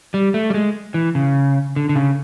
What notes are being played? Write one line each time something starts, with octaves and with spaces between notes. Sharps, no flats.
G3
A3
G3
G#3
E3
C#3
D3
D3
C#3